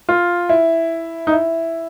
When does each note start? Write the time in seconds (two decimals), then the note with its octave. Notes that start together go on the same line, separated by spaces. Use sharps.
0.09 F4
0.49 E4
1.27 D#4
1.32 E4